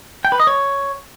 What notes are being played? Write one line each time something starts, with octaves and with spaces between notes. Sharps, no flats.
G5
B4
D#5
C#5